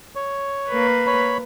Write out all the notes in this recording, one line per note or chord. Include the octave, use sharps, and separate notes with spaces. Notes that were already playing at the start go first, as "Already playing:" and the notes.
C#5
A#3 B4
C#5 B5